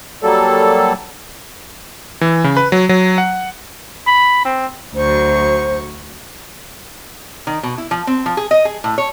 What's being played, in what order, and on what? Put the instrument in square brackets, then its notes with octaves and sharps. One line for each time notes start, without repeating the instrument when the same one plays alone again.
[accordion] F#3 G3 A#3 A4
[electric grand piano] E3
C#3
B4
F#3
F#3
F#5
[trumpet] B5
C4
[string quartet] D2 F#3 C#6 [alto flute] C5
[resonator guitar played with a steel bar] D#3
B2
E4
F3
C4
F3
G#4
D#5
G#4
A2
C#5